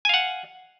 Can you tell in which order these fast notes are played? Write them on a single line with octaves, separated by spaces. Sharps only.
G#5 F5 F#5